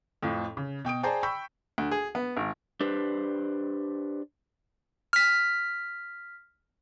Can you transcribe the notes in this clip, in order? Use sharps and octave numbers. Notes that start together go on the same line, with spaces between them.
F2 A2 F3
C#3
B2 G5 D#6 D7
G#4 C5 D5 G5 A5 A#5
G5 B5 C#6 E6 G6 B6
D2
G#4
B3
G#1
D4 G4 B4 C5
F6 B6